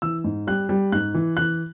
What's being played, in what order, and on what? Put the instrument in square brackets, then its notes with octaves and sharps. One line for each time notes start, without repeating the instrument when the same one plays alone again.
[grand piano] E3 E6
G#2
G3 F#6
G3
G#2 F#6
E3
E3 F#6